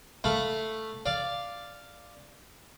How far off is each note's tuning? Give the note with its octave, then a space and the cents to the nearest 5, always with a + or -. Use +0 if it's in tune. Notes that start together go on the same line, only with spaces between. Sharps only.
A3 +0 F5 +0 B5 +0
D5 +0 F5 -5